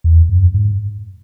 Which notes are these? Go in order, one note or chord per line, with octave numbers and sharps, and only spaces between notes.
E2
F#2
G#2